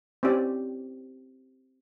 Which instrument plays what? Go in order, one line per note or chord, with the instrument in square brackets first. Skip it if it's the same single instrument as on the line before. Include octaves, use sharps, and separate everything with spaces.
[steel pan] C4 C#4 E4 G4 D5